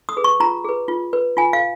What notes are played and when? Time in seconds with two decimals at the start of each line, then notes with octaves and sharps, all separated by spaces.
0.09 D#6
0.17 G#4 B4
0.24 C#6
0.40 F4 A#5
0.64 G#4 B4
0.88 F4
1.13 B4
1.37 F4 G#5
1.53 F5